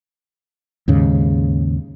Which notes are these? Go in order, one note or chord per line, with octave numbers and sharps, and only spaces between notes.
D#2 G#2 C#3